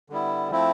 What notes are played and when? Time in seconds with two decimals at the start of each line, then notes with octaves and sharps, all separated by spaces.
0.10 D3 G3 B3 E4
0.50 F3 A3 C4 E4